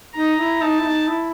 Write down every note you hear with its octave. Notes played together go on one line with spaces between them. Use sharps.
D#4 A#5
E4
D#4 A5
E4
D#4
E4